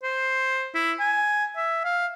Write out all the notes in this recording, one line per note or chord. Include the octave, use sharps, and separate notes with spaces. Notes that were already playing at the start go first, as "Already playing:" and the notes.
C5
E4
G#5
E5
F5